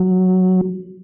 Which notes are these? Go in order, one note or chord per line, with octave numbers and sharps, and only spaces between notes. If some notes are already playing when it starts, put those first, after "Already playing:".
Already playing: F#3